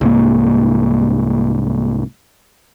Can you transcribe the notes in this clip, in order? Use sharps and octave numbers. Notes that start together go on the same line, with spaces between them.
C2 G#2 A#3